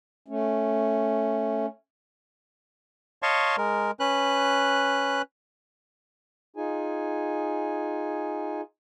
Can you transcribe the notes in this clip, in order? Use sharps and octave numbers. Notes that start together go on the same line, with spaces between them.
A3 C#4
C#5 D#5 F5 A5 C6 C#6
G#3 A#4
C#4 B4 F#6
D#4 F4 G#4 G#5